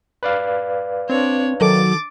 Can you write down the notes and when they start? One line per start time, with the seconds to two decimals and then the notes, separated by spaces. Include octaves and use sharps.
0.23 B4 D5 F5
1.10 C4 D4 C#5
1.61 D#3 F#3 A4 D6 A6